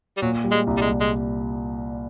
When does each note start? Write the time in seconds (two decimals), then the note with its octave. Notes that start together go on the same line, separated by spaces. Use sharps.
0.17 G3
0.22 A#2 F#3
0.44 G3
0.51 G#3
0.67 C2
0.77 G3
0.81 G#3
0.89 C2
1.00 G#3